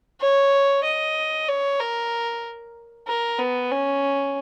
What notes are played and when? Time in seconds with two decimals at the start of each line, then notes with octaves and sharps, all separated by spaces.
0.21 C#5
0.85 D#5
1.48 C#5
1.80 A#4
3.08 A#4
3.39 B3
3.71 C#4